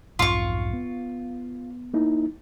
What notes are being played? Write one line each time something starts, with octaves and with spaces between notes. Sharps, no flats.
B1 F2 G#2 F4 C#6
B3
A#3 D#4 E4